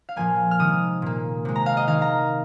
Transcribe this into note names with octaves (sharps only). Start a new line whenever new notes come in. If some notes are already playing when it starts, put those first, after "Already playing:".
F5
A#2 F3 A#3 G#5
F6
C3 D#3 G#3 D#6
A#2 A#3
C3 G#3
A#5
F5
D#5
D#3 A#3 F5
A#5